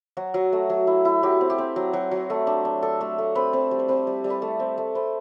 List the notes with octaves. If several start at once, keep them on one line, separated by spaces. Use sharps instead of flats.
F#3 F#4
F#3
A3
F#3
E4
E4
F#3 G4
C4
G4
C4
F#3
F#3
F#3
A3
D4
D4
D4 A4
A3
A3
C4 B4
C4
G3
C5
C4 B4
G3
G3
B4
A3 A4
C4
A3
C4 B4